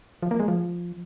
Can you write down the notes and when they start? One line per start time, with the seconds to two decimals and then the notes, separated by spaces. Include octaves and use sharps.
0.22 F3
0.31 A#3
0.40 G#3
0.48 F3